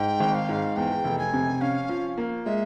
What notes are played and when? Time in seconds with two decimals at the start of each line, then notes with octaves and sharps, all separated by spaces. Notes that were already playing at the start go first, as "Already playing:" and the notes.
Already playing: G#2 G5
0.20 G#1
0.35 F5
0.49 G#2
0.76 E2 G5
1.04 F1
1.19 G#5
1.33 C3
1.61 C#4 F5
1.89 F3
2.18 A#3
2.45 G#3 E5